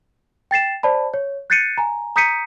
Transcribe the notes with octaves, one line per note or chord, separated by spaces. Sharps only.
G5 A6 C7 E7
C5 D5 A5 B5
C#5
F#6 G6 A6 C7 C#7 D#7
G#5 A#5
A#5 D#6 G6 B6 C#7 D#7